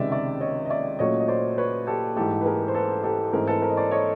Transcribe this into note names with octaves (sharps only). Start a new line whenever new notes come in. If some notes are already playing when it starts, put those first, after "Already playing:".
Already playing: C#2 C3 D#3 G#3 D5 E5
D5 E5
C#5 D#5
D#5
D5 E5
A#2 F#3 A3 C#4 C#5 D#5
D#5
C5 D5
B4 C#5
G4 A4
G#2 E3 A3 G4 A4
B4
G#4 A#4
C5
A4 B4
G4 A4
G#2 E3 A3 C4 G#4 A#4
A4 B4
A#4 C5
D#5
C5 D5
C#5 D#5